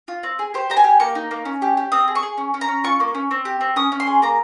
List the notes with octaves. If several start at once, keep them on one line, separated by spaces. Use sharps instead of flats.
F4
C4
G#4
G4 C5
G4 A#5
G#5
G4
A#3 C#6
D#4
A#3
C#4
G4
G4
C4 D#6
G#4
C#6
G#4
C#4
C#4
A#5
C#4
F4 C#6
A#3
C#4
C4
G4
C4
C#4 D#6
C#4
C6
G#4
A#3 A#5